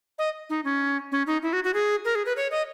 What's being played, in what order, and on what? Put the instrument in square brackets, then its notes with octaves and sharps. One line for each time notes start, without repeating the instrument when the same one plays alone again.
[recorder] D#5
D#4
C#4
C#4
D#4
E4
F#4
F#4
G#4
A#4
G#4
B4
C#5
D#5